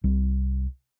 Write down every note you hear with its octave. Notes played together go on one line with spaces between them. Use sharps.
C2 G3